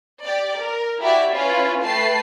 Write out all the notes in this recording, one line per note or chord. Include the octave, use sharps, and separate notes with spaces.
G4 D5
A#4
E4 F#4 G4 D5 E5
C#4 E4 F4 B4
A3 B4 G5 A5 C7